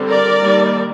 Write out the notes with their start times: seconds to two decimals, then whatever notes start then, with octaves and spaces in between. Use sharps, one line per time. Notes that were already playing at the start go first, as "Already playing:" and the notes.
Already playing: D3 G3 C4
0.09 A#4 D5
0.41 D#3 G3 A#3